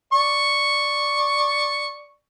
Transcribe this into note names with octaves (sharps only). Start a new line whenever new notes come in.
D5 C#6